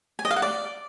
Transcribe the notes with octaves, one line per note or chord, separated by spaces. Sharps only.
G#5
D#5
F5
F#5
D5